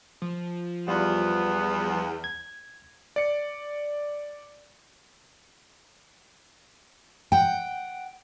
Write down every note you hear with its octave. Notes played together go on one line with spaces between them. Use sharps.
F3
E2 G3 B3 F4
G#6
D5 C#7
F#5 G5